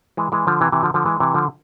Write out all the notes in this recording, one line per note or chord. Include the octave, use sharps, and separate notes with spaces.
E3 G#3
E3 G#3
D3 F3
C3 E3
C3 E3
D3 F3
D3 F3
E3 G#3
C3 E3
D3 F3